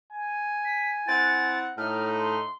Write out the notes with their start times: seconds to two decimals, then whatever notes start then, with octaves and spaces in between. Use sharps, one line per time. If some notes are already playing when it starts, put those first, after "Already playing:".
0.13 G#5
0.65 B6
1.07 C4 E4 F#5 A6
1.78 A2 D#4 F6
2.18 C6